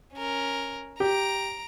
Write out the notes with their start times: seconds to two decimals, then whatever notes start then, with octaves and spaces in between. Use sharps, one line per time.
0.14 C#4 A#4
1.00 G4 A#5 D7